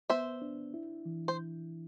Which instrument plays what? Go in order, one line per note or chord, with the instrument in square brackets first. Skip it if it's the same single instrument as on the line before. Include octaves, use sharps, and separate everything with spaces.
[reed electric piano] B3 [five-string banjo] C5 E5
[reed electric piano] D4
E4
E3
[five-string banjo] C5